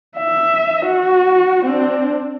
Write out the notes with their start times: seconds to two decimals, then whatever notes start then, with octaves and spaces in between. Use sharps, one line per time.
0.18 E5
0.86 F#4
1.65 C4 D4